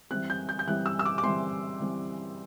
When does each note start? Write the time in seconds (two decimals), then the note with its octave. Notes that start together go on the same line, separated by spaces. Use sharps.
0.11 E3 G3 C4 F#6
0.30 G6
0.49 G6
0.59 G6
0.67 E3 G3 C4 F#6
0.86 E6
0.99 E6
1.05 D6
1.18 D6
1.23 E3 G3 C4 C6
1.81 E3 G3 C4